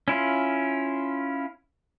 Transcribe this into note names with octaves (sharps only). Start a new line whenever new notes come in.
C#4 E4 F4